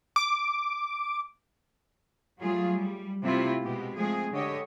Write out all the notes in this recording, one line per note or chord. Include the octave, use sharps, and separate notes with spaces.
D6
F#3 G3 A3 F4 G#4
G3
C3 A3 C4 E4 F4
B2 G#3 G4
F3 G#3 A3 C4 G#4
D3 G4 C#5 D#5